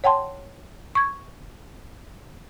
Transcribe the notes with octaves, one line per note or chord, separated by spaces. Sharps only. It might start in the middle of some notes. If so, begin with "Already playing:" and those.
C#5 F#5 G5 A5 C6
C#6 G#6